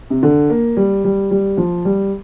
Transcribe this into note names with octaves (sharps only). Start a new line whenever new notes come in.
C3
D3
A#3
G3
G3
G3
F3
G3